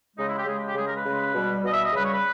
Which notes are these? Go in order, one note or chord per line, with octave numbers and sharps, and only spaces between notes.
C#3 G#3 D#4
E4
G4
C#3 G#3 G#4
G4
G4
C#3 G#3 G#4
A#4
B4
C#3 G#3
B2 G3
B2 G3 D#5
E5
D#5
C#3 G3 B4
C#5
B4